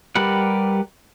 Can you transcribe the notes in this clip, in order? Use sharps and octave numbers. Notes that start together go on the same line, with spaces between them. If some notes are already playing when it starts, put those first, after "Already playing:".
G3 G4 A#4 B4 F#5